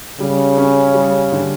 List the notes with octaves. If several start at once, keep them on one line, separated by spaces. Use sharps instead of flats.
C#3 G3
C#4
G3
D3